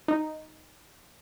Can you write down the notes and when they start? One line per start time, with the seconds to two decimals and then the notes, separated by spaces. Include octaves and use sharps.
0.08 D#4